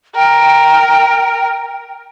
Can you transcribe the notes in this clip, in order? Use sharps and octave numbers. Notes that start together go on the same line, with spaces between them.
A#4 G5